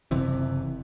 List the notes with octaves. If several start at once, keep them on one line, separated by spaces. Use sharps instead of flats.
F#1 C3 E3